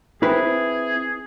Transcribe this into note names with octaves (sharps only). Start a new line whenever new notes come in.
C4 E4 G#4 B4